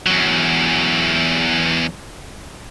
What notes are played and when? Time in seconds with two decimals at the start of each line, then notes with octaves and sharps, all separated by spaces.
0.06 E2 F#3